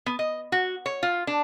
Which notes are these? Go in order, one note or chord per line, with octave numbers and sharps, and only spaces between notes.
B3
D#5
F#4
C#5
F4
D4